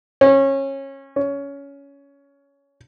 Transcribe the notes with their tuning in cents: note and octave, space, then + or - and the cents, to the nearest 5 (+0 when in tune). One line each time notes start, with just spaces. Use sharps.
C#4 -25
C#4 +15